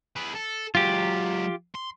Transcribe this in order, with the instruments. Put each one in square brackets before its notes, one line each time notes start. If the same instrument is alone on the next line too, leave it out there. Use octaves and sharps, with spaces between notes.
[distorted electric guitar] G#4 B4
A4
[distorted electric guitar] F#3 G#3 [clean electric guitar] F4 G4
[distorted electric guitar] C6